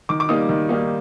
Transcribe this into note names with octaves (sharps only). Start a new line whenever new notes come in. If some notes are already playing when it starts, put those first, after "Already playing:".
D#3 D6
D6
G3 A#3 D#4 D#6
D#3
G3 A#3 D#4